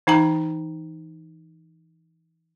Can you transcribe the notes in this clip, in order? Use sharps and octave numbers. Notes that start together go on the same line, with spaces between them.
E3 D#4 G5 A#5